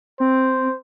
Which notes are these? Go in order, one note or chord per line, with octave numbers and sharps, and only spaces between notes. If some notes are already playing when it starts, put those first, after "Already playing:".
C4 C5